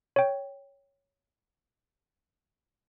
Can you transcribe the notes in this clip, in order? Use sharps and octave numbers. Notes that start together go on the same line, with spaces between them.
C#5 G5